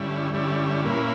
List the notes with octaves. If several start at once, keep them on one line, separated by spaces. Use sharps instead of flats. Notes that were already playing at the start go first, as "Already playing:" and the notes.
Already playing: G2 D3 G3 C#4 E4
G2 D3 G3 C#4 E4
A#2 A#3 C#4 E4 B4